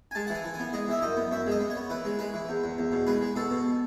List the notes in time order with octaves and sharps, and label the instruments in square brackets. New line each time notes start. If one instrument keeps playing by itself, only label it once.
[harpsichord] G#5
G#3 A5
E3 F#5
G#5
E3
G#5
B3
G#3 D#5
E3 E5
F#2 D#5
B3
F#2 E5
G#3
D#5
B3
C#5
B3
E3 B4
G#3
G#3 B4
E3
E2
E2
E2
B2
G#3 B4
G#3
B2 A4
B2